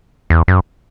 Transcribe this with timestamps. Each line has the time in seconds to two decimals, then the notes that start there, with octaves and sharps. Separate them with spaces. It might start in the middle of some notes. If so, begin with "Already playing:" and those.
0.30 E2
0.48 F#2